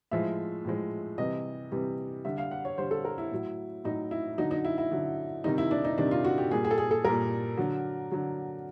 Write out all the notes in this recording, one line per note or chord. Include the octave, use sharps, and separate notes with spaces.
A2 F3 G#3 E5
A2 F3 G#3
C3 E3 G3 D#5
C3 E3 G3
D3 G3 E5
F5
F#5
C#5
D3 G3 C5
A4
A#4
E4
A2 F#3
A2 F#3 D#4
E4
D3 F#3 D#4
D#4
E4
E4
D3 F#3
C3 D#3 G3 D#4
E4
D4
D#4
C3 D#3 G3 D4
F4
F#4
G4
A#2 G3 G#4
G#4
A4
G#4
A4
A#2 G3 A#4
D3 F#3
D3 F#3